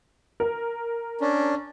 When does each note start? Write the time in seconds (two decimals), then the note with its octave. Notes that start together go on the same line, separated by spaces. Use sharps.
0.40 A#4
1.21 C#4 D4